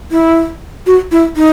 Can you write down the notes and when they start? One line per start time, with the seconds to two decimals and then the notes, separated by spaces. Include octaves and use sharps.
0.12 E4
0.87 F#4
1.12 E4
1.37 D#4